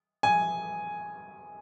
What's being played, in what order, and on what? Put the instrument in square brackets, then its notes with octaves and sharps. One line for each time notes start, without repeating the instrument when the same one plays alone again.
[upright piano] G#5